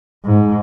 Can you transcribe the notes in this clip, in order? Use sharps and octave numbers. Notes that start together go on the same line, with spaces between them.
G#2